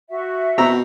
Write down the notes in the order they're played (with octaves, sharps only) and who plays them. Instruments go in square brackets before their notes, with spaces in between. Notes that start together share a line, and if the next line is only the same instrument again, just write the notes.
[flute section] F#4 E5
[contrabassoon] B2 [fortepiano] C4 A#5 E6